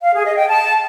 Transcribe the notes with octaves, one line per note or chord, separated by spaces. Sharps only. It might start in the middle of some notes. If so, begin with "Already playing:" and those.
F5
G#4
D#5
G5
A5